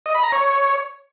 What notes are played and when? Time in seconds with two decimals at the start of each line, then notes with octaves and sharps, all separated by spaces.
0.06 D#5
0.15 B5
0.23 A#5
0.32 C#5